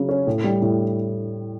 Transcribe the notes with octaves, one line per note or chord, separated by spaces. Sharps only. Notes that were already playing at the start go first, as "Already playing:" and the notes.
Already playing: C#3 F#3
C#4
A2
G3
A2